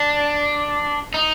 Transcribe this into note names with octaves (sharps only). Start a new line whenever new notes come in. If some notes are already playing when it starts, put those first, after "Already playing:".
Already playing: D4
D#4